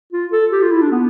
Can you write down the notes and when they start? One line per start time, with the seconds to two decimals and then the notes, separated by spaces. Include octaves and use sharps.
0.12 F4
0.32 A4
0.52 G4
0.62 F4
0.72 E4
0.81 D4
0.92 B3